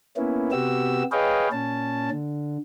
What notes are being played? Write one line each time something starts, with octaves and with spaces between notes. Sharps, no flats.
A#3 B3 C#4 E4
C3 B3 F#4 G4 E6
G#4 B4 C#5 D#5 F5 G5
A#2 C#4 A5
D3